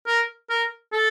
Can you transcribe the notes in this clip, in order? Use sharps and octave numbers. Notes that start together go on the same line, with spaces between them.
A#4
A#4
A4